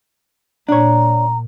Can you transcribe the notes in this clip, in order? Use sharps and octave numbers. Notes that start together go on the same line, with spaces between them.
A#2 D4 C#5 A#5